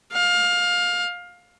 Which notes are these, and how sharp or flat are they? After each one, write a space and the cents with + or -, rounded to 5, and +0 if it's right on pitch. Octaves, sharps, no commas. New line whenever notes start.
F5 +20